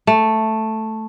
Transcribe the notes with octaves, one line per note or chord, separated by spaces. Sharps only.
A3